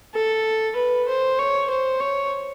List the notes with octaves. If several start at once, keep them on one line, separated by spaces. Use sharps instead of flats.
A4
B4
C5
C#5
C5
C#5